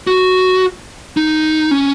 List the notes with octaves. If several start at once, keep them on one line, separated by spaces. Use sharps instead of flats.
F#4
D#4
C#4